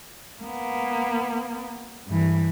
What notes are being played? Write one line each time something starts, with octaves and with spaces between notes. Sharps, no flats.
A#3 B3
G2 E3